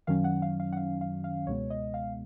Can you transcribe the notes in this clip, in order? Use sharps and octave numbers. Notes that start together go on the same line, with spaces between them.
F#2 D#3 F#3 C#4 F5
F#5
F5
F5
F#5
F5
F5
F5
C#2 B2 G#3 B3 C#5
D#5
F5